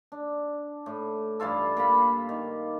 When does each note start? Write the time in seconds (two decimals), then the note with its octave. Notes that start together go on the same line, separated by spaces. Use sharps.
0.12 D4
0.86 A2
1.40 G2 E3 F4 A4
1.77 A#3 A5 B5
2.29 D#3